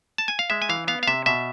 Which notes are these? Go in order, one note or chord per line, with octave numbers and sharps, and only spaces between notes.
A5
G#5
F5
G#3 E5
G#5
E3 F5
B3 F5
F5
C3 E5
B2 E5